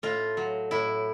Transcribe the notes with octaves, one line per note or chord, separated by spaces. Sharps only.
A2 F4
F#3
A2 E4